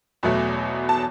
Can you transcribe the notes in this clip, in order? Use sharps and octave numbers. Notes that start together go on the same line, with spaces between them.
E2 B2 F#3 A3
A5